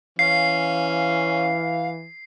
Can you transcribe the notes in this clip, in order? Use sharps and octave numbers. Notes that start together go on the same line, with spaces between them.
E3 C#4 F5 C7